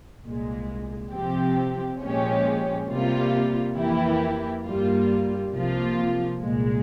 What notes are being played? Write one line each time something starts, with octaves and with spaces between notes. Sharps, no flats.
C2 A#2 G#3
C3 F3 C4 G4
A#2 F3 G#3 C#4 G4
C3 G3 A#3 F4
F2 E3 A#3 E4 G4
G2 G3 A#3 F4
C2 C3 F3 A#3 F4
C2 A#2 G#3